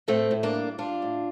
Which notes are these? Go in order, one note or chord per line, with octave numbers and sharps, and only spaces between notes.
A2 A3 C4
A2
A#3 D4
G3
G3 D4 F4
A2